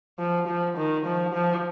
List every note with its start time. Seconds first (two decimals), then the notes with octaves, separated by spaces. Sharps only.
0.19 F3
0.47 F3
0.77 D#3
1.06 F3
1.34 F3